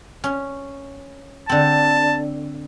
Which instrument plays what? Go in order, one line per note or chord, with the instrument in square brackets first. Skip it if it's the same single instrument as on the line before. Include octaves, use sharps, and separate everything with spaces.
[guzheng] C#4
[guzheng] D3 C4 [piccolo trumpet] A5